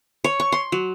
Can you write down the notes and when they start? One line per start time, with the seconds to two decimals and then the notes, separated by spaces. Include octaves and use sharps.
0.24 C#5
0.40 C#6
0.52 C6
0.72 F#3